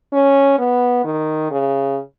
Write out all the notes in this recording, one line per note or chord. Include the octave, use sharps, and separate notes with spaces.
C#4
B3
D#3
C#3